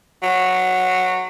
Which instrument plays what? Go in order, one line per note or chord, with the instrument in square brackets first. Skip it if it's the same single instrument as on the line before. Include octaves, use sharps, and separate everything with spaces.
[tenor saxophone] F#3